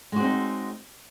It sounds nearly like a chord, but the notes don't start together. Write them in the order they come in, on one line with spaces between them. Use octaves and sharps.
G#3 F#4 C4 D#4